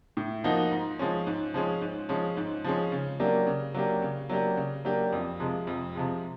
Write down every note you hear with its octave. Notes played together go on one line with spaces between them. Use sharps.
A2
F3 A#3 D#4 F#4
G#2
F3 G#3 C#4
G#2
F3 G#3 C#4
G#2
F3 G#3 C#4
G#2
F3 G#3 C#4
C#3
F#3 A#3 D4 G4
C#3
F#3 A#3 D4 G4
C#3
F#3 A#3 D4 G4
C#3
F#3 A#3 D4 G4
F2
C3 F3 G#3
F2
C3 F3 G#3